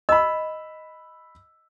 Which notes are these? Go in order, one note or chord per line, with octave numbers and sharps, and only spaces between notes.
D#5 B5 E6